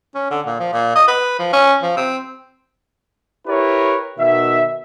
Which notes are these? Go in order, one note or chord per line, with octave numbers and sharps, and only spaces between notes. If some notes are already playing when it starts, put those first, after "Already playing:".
C#4
D3
A#2
F3
A#2
D#5
B4
F3
C#4
F3
C4
E4 G4 A#4 B4 C#5
B2 D#3 E5